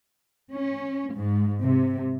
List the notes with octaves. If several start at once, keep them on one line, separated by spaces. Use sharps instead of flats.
C#4
G#2
C3